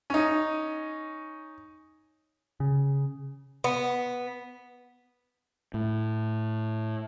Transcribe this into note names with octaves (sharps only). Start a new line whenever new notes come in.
C#4 D#4
C#3
B3
A2